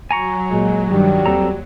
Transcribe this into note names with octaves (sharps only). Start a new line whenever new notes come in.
F#3 G#5 A#5 C#6
A#2 G#3
G2 D#3 G3
D#2 C4 A4 A#5